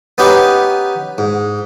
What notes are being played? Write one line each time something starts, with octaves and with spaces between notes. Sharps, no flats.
B3 C#4 D#4 G4 B4
G#2